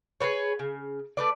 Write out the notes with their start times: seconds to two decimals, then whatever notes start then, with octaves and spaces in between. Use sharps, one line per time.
0.20 G#4 A4 B4 C#5
0.59 C#3
1.17 A3 B4 D5